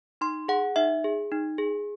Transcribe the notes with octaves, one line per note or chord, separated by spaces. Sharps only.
D#4 C6
G#4 F#5
D#4 E5
G#4
D#4
G#4